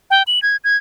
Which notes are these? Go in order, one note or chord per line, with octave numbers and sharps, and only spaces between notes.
G5
F#7
G#6
G#6